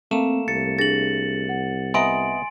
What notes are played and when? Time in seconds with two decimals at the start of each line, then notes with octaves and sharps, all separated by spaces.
0.11 A3 A#3 C4 E7
0.48 C2 A6 C#7
0.79 D4 G#4 A6 A#6 F#7
1.49 F#5
1.94 B3 D#5 E5 G#5 A#5 C6 D7